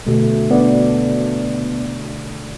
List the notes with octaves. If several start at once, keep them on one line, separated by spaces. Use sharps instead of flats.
B2 D3 A3
B3 D4 D5